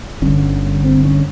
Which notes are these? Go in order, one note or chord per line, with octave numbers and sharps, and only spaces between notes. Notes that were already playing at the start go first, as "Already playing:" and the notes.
G1 G2 D3 C#4
C4
C#4